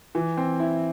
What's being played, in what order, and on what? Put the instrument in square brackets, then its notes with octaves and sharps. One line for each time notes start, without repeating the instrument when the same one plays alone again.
[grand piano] E3
C4
E4